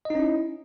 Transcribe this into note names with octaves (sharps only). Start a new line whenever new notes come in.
C#4 D#4 E4 D#5